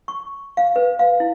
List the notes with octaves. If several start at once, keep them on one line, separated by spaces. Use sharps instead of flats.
C#6
F5
B4
F5
E4